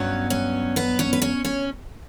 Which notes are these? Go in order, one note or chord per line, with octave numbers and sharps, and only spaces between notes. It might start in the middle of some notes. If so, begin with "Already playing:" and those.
Already playing: G2 F#3 B3 C#4 C#5
C#4 C#5
B3 B4
C#4 C#5
B4
C#4 C#5
C#4 C#5